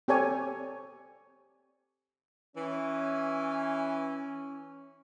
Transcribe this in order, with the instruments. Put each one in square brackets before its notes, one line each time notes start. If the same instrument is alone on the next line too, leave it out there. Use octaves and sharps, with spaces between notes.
[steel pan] C4 G4 A4 C#5 D5 G#5
[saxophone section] E3 [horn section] C#4